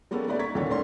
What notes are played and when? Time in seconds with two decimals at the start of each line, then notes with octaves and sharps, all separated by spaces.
0.11 G3 G#3 A#3 B3 C#4 A4
0.27 G#3 A3 D#4 B4 D5 E5
0.39 A#5 C#6 G#6 A6 B6
0.54 D#1 C2 D3 A#3 C#5 A6
0.70 A2 A3 D4 A#4 C#5 C6